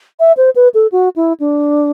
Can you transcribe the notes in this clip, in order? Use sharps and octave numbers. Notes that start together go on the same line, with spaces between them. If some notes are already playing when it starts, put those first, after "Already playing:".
E5
C5
B4
A4
F#4
E4
D4